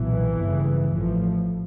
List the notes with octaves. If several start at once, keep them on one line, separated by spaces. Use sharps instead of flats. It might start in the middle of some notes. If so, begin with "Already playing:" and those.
Already playing: B1 A#2 E3
G1 F2 C#3
A1 A2 F3